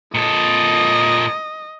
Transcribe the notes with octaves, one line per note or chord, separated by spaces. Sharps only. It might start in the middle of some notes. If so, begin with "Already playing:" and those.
A#2 A4 D#5